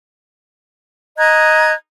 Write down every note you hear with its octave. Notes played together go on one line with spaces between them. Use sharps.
D#5 A#5 F#6 G#6